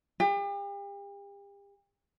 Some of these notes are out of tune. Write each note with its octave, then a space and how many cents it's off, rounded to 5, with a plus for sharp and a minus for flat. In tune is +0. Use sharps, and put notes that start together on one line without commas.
G4 +40